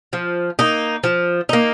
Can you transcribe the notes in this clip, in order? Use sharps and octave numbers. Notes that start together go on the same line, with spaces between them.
F3
A#3 D#4
F3
A#3 D#4